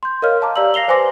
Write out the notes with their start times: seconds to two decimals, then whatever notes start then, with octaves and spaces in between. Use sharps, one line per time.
0.03 C6 G6
0.22 A#4 C#5 D#5 F5 F6
0.41 F5 A5 A#5 D6
0.56 G4 D5 F5 A#5 E6 F#7
0.74 F5 A#6 C7 F7 G7
0.88 B4 C5 G#5 C6 D6 A#6